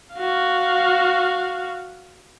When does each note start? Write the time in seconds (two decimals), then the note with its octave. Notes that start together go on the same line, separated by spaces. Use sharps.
0.16 F#4 F5